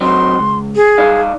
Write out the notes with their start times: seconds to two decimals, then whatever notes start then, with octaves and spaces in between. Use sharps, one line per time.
0.01 F#3 C4 D#4 C6
0.39 C#2
0.76 G#4
0.98 D#4 D5 F5